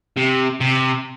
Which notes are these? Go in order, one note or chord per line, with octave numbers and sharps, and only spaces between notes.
C3
C3